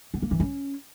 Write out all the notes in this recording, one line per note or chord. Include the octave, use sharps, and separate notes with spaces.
B3
A#3
E3
C#4